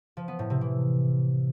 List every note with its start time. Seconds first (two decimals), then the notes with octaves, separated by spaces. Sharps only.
0.17 F3
0.28 B3
0.39 A2
0.50 C3
0.61 E3